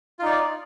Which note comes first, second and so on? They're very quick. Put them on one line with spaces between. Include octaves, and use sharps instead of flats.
F4 D#4 D5